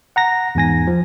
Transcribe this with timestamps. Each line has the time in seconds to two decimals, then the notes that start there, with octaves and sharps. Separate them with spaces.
0.16 F#5 A#5 A#6
0.55 E2 G#2 G#5 A#6
0.87 F3